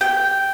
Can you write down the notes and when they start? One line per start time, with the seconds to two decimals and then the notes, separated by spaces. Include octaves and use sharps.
0.01 G5